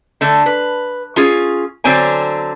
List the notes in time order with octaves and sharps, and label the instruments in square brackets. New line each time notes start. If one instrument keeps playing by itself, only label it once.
[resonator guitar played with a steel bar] D3 A3
B4
C#4 F4 G#4
D3 F#3 C4 D4 G#5